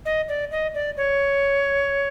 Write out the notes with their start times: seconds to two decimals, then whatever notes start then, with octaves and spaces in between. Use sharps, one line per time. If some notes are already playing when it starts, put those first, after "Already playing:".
0.05 D#5
0.29 D5
0.51 D#5
0.75 D5
0.97 C#5